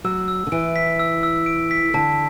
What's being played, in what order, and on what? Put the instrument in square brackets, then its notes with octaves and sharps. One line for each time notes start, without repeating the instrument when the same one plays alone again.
[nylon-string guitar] F#3 [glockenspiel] E6
[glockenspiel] E6
[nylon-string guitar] D3
[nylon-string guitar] E3 [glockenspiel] D7
[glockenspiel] B6
E6
E6
D7
B6
[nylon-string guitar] D3 [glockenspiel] A5